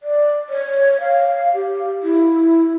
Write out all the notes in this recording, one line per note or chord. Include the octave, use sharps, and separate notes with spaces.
D5
C#5
F5
G4
E4